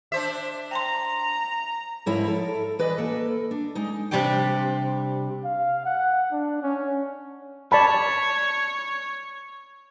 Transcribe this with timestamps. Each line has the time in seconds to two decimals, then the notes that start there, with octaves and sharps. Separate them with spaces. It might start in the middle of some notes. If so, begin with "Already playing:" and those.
0.12 D4 C5 E5
0.71 G5 A5 A#5 C6
2.06 G#2 F3 E4 A#4 C#5 E5
2.27 A4 A#4
2.79 E3 B4 D5 D#5
2.98 A#3 A4
3.51 D4
3.75 G#3 D#4
4.11 C3 G3 D4 G4 G5
5.44 F5
5.85 F#5
6.32 D4
6.62 C#4
7.72 C#5 D5 A5 B5